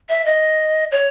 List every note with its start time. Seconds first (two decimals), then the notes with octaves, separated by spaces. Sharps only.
0.09 E5
0.25 D#5
0.91 C#5